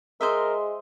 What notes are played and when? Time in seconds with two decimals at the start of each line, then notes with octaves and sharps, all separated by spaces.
0.21 G#3 A#4 C5 D#5 E5